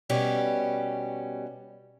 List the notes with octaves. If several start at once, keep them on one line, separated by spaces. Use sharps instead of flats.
B2 G3 C#4 G4